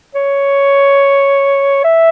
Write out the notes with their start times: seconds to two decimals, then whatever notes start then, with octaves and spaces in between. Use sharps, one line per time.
0.15 C#5
1.84 E5